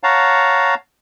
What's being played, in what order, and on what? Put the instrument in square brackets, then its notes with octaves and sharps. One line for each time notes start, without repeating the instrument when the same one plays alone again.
[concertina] C#5 F5 F#5 A5 A#5